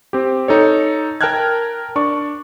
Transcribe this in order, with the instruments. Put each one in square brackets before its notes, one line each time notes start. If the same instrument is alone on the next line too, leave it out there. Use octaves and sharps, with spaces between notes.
[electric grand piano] C4 G4
D#4 A4 C#5
A#4 G5 A5 F6 F#6 G#6
D4 D5 C#6